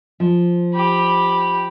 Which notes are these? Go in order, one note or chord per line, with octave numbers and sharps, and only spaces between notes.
F3
G4 B5